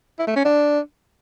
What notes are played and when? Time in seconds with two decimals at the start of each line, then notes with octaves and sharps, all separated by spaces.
0.19 E4
0.27 A3
0.36 C#4
0.45 D4